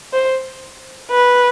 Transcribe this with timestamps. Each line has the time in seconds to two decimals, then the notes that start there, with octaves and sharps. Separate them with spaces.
0.13 C5
1.11 B4